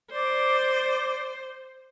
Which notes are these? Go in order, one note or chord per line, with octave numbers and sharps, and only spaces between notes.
C5 D5 D6